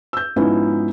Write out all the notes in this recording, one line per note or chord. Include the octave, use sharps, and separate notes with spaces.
E6 G6
G#2 F3 B3 C#4 D#4 E4